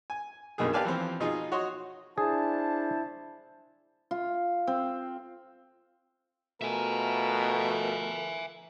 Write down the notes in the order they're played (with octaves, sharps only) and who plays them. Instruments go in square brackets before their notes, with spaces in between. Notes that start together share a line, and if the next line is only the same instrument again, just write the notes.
[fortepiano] G#5
B1 G2 B2 D#3 A#3 G#4
G4 B4 D5 F5 G#5 A5
E3 F3 C4
B2 D#4 F4 G#4
F#4 C#5 D#5 C6
[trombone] D4 [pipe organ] E4 [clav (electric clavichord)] G#4 [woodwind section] C5 A5
[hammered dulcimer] F4
C4
[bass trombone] B2 [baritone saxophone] A3 [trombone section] F4 A#4 [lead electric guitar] E5 G#5